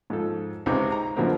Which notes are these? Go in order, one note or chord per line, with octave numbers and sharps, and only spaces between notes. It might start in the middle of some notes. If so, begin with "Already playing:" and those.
G#2 F3 A4
C#2 C3 G#3 C4 D#4 D6
A#5
F#2 B2 D3 F3 A#3 C4